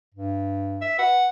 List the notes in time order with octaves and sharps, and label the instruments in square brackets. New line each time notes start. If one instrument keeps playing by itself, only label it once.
[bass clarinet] G2
[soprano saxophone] E5
[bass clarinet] B4 [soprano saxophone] F#5